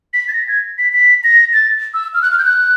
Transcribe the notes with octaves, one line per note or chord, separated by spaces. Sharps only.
B6
A6
A#6
G#6
B6
B6
A#6
A6
E6
F6
F#6
F6
G6
F#6